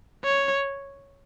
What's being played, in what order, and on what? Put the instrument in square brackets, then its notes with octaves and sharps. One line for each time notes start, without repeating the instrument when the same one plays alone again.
[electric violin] C#5